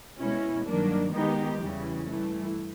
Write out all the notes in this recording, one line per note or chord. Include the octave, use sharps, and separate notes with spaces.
B2 G#3 C#4 E4
G2 D#3 F#3 A#3 D4
D#3 G#3 B3 D#4 G4
E2 C#3 E3 G3
G2 E3 A3